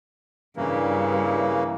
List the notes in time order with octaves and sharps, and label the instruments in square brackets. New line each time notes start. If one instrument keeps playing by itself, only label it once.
[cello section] G2 [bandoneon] C#3 E3 A#3